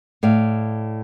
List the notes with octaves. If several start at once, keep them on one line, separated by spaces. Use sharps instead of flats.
A2 D5 F5